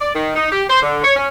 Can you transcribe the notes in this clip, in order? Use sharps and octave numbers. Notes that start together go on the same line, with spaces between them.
D5
D#3
D#4
G4
C5
D3
C#5
C#4